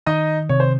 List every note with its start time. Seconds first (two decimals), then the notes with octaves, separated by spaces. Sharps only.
0.06 D#3 D#4 D#5
0.49 C3 C#5
0.60 C5